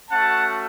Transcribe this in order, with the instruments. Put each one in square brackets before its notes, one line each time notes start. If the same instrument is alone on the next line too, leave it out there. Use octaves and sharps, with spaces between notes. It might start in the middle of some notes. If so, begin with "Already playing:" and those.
[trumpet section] A3 C#4 F#4 F#5 A5